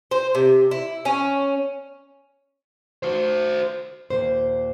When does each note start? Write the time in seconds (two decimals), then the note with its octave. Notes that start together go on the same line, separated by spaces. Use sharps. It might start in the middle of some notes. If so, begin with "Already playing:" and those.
0.11 C5
0.35 C3
0.71 E4
1.05 C#4
3.03 F#4 C5
4.10 D#2 A#2 C5